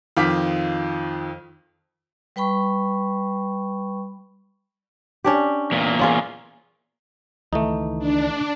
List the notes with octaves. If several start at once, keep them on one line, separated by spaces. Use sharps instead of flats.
F2 D#3 F4 F5 D6 B6
G3 B4 G5 B5 C#6
C#4 D4 G4
E2 A#2
C#4 F4 G#4
C#2 D#3 E3 A3 D#4
D4